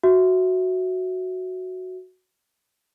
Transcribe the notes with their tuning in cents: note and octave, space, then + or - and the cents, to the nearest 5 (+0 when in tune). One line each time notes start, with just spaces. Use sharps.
F#4 +0 E5 +0